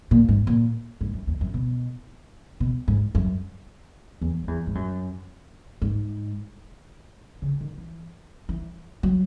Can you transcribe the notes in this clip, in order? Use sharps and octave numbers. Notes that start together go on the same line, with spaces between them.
A#2
G#2
A#2
G#2
F#2
E2
F#2
B2
B2
G#2
F#2
E2
F#2
E2
G#2
F#2
G#2
C#3
D#3
E3
E3
F#3